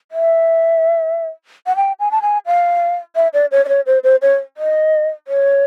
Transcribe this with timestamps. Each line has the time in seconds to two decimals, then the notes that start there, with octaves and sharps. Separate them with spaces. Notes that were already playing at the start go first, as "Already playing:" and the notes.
0.12 E5
1.66 F#5
1.76 G5
1.99 G#5
2.11 A5
2.22 G#5
2.46 F5
3.15 E5
3.33 D5
3.51 C#5
3.65 D5
3.68 C#5
3.86 C5
4.04 C5
4.22 C#5
4.57 D#5
5.28 C#5